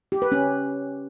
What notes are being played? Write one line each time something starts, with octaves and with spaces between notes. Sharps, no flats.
G4
B4
C#4